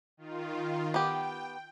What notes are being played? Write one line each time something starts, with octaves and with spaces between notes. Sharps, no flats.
D#3 F4
B3 G4 G5